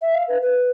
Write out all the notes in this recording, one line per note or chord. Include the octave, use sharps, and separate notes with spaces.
E5
F5
B4
B4